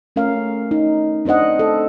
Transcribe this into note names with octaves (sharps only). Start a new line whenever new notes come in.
A3 C#4 A#4 F5
D#4
C4 D4 C5 D#5 F#5
A4